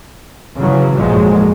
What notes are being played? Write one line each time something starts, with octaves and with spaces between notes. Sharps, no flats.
C#3 E3 F#3
G#1 F2 A#2 F3 F#3 G#3